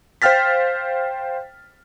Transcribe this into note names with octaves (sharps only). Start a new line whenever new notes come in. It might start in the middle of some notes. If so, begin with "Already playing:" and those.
C5 F5 G5 F6 A6 B6